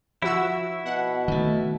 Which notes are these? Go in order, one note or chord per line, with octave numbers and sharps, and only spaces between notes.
F3 E4 F#4 E6
B2 F#5
D#3 A3